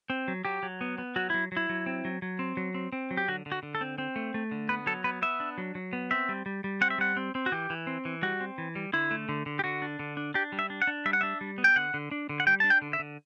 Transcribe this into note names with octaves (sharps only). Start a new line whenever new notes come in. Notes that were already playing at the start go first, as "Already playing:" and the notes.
C4
F#3
F#3 G4
F#3
B3
B3
F#3 F#4
F#3 E4
F#3 E4
F#3
C4
F#3
F#3
C4
F#3
C4
C4
F#3
G4
D3 F#4
D3
F#4
D3
A4
C4
C4
A3
A3
D3
B3 B4
F#3 A4
B3 B4
B3 E5
D4
F#3
F#3
B3
C4 E5
G3
G3
G3
C4 F#5
E5
G3 F#5
C4
C4
F#4
E3 G4
E3
C4
E3
G3 F#4
C4
E3
G3
D3 E4
A3
D3
D3
G4
D3 F#4
D4
D3
D4
D4 G4
G3
E5
D4
F#5
D4
G3 E5
F#5
D4 E5
G3
B3
G5
D3 F#5
D3
D4
D3
F#5
G3 G5
D4 A5
G5
D3
E5
D3